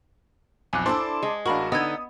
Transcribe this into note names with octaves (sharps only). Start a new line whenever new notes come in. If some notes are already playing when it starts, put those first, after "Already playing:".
B1 F2 G#5 D6 F#6
D4 E4 A4 C5 A5 C6 D6
G#3
A1 D4 F#4 A#4 F5 B5 C#6
D3 B3 D#4 D#5 D#6 E6 G#6